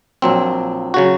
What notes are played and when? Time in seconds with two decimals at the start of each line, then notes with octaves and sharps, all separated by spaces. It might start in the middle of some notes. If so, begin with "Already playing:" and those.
0.22 A#1 A#2 F#3 C4
0.94 C#3 F#3 F#4